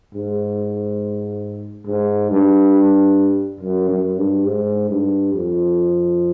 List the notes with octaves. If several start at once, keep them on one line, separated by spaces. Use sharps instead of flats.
G#2
G#2
G2
F#2
F#2
G2
G#2
G2
F2